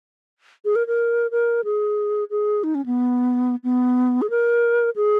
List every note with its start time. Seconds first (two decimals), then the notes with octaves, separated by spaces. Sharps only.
0.65 G#4
0.76 A#4
0.87 A#4
1.31 A#4
1.64 G#4
2.31 G#4
2.64 D#4
2.75 C#4
2.86 B3
3.64 B3
4.22 G#4
4.30 A#4
4.96 G#4